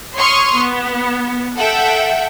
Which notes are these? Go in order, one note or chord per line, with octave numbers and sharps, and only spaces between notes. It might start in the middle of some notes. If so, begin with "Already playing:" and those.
C#5 C6 C#6 D#6 F6
B3
A4 E5 F#5 G5